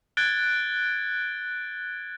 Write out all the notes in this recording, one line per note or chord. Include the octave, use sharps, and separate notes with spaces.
F#6 G#6 A6 D7 G7